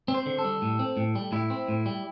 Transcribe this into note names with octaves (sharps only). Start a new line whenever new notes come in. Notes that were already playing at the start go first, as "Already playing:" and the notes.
C4
C5
D3
A4
G3
A2
C4
A2
G3
A2 E4
C4
A2
G3